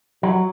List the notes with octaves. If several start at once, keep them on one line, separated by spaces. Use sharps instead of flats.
F#3